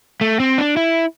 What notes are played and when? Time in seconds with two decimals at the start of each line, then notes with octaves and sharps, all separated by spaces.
0.21 A3
0.40 C4
0.58 D4
0.77 E4